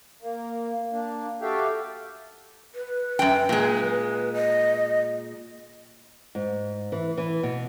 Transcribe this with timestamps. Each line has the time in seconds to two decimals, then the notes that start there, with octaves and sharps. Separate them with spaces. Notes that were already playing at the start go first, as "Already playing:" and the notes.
0.22 A#3
0.91 A#3 D4
1.42 F#4 G4 A4 E5 F5 G5
2.75 B4
3.19 F#2 G5
3.49 A#2 G#3
4.34 D#5
6.35 G#2
6.92 E3
7.18 E3
7.43 B2